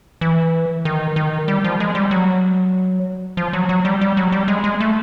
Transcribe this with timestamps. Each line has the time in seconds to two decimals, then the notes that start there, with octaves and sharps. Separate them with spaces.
0.21 E3
0.85 D#3
1.16 D#3
1.48 G3
1.64 F3
1.80 G#3
1.95 G3
2.11 F#3
3.37 F3
3.53 F#3
3.69 F#3
3.85 G3
4.01 G3
4.17 F#3
4.32 G3
4.48 G#3
4.64 G#3
4.80 A3